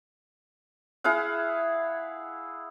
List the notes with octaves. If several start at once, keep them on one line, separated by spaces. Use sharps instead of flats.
E4 G#4 F5 F#5